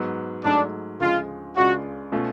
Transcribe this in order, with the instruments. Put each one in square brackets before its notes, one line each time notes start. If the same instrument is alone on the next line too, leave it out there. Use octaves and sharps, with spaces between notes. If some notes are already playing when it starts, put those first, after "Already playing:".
Already playing: [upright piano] G#2 F#3 B3
[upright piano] G#2 F#3 A3 [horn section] D4
[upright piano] D2 C#3 F3 G#3 [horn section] F4
[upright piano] C#2 C#3 G#3 D4 F4 [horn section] F#4
[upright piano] B2 A3 C#4 F4